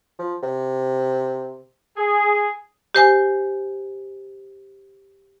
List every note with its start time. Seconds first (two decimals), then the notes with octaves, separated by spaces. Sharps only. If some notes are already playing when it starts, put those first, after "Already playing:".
0.19 F3
0.43 C3
1.96 G#4
2.95 G4 C5 G#5